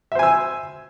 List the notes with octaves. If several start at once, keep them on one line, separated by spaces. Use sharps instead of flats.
C5 E5 G#5 E6